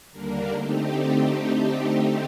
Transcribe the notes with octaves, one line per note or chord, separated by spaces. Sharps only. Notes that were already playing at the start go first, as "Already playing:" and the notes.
D#2 D3 G3 A#3 D4 A#4
D3 A3 C4 D#4 G4